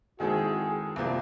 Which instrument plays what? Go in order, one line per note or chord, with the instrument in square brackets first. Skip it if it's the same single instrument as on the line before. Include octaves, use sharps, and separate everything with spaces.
[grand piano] D#3 G#3 C4 E4 A4 [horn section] F#4 G#4
[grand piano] C2 C3 F3 A#3